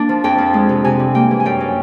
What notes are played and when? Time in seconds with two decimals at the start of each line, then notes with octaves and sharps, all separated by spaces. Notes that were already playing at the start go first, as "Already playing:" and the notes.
Already playing: A#3 D4
0.09 F3
0.24 F2 G5
0.38 F3
0.54 G#3
0.69 C3
0.84 C3 G#5
0.99 G3
1.15 A#3 G5
1.31 E3
1.40 G#5
1.45 F#2 G5
1.60 F#3